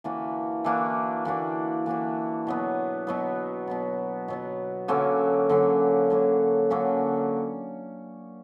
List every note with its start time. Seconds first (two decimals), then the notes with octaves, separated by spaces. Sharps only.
0.04 E3 A#3 D4 F#4
0.64 E3 A#3 D4 F#4
1.25 E3 A#3 D4 F#4
1.86 E3 A#3 D4 F#4
2.47 B2 F#3 B3
3.07 B2 F#3 B3
3.67 B2 F#3 B3
4.28 B2 F#3 B3
4.88 D3 F#3 A#3 C#4
5.49 D3 F#3 A#3 C#4
6.10 D3 F#3 A#3 C#4
6.70 D3 F#3 A#3 C#4